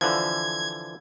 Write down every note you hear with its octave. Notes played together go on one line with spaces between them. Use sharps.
D3 E3 F3 G#6